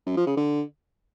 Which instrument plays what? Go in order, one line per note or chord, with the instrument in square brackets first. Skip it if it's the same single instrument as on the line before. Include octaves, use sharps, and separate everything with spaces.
[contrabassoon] F#2
F3
C#3
D3